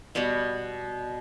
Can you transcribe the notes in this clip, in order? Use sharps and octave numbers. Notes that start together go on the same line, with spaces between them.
B2 G3 B3 F#4